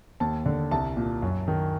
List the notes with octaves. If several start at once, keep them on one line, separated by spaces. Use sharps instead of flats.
D#2 A5
D3
C2 A5
A#2
F#2
D#3